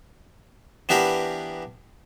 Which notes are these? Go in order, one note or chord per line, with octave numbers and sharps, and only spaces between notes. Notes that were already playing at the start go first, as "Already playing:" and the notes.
E3 B3 D4 G4 A#4 B5